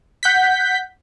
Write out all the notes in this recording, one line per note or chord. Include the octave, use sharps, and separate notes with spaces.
F#5 G6 B6